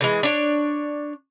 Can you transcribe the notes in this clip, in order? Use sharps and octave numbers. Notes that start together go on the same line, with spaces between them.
D3 E3 G#3
D4 C#5